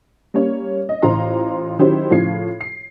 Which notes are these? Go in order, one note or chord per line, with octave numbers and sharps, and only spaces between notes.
G3 A#3 C#4 C#5
D#5
A1 F4 C5 A#5 C6
D#3 F#3 C#4 E4 G4 C5
A2 C#3 F3 F4 G#6 C7
C7